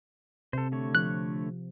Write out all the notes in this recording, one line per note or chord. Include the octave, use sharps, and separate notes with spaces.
C3 A4 C5
D3 A3 C#5
F3 F#6